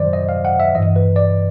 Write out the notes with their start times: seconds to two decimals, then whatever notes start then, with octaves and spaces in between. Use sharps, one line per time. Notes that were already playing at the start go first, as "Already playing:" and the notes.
Already playing: F#2 D#3 F#3 C5 D5
0.13 D#5
0.29 F5
0.45 F#5
0.60 E5
0.75 G2 E3 D#5
0.96 B4
1.16 D5